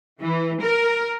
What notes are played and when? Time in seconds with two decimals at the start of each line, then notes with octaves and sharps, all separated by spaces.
0.20 E3
0.61 A#4